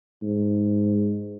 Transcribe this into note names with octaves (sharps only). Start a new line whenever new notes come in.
G#2